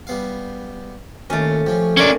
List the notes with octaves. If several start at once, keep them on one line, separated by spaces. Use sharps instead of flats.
G3 B3 F5
D#2 A#2 A3 C#4
F3 C#4 G4
A#3 C#4 D4 C#5 D5 G#5 B5